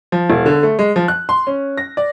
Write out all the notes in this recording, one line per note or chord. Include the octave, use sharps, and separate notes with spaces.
F3
E1
D3
A3
G#3
F3
F#6
C6
C#4
A#6
D5